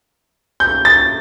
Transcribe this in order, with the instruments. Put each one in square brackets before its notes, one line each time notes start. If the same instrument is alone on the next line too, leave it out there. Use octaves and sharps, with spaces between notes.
[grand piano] G6
A6